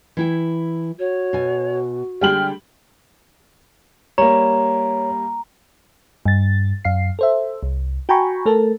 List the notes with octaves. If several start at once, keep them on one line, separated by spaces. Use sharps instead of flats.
E3 E4 G5
F#4 C#5
B2 G#5
D3 G3 G#3 G5 F6 F#7
G3 A#3 C#5 A#5
G2 A6
F#2 F5 C7
A4 C5 E5
C2
F#4 G5 G#5 A#5 B5 C#6
A3 A4 A#4 A5